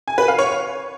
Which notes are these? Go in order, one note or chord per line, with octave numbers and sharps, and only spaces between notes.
G#5
B4
F5
C#5